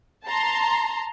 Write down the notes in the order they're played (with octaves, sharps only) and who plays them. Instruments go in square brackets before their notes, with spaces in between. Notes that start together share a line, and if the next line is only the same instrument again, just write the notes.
[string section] A5 A#5 C6